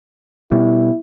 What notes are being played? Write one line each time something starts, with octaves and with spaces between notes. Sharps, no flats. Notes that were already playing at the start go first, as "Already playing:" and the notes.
B2 G3 E4